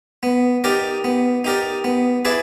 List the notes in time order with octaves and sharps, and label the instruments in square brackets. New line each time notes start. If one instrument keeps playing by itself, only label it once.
[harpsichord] B3
D#4 G4 A#4 D5
B3
D#4 G4 A#4 D5
B3
E4 G#4 B4 D5